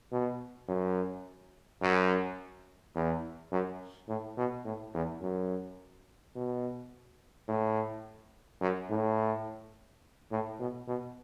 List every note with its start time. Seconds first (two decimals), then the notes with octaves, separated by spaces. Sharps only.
0.12 B2
0.68 F#2
1.82 F#2
2.95 E2
3.52 F#2
4.08 A2
4.37 B2
4.65 A2
4.94 E2
5.22 F#2
6.36 B2
7.48 A2
8.61 F#2
8.90 A2
10.32 A2
10.60 B2
10.88 B2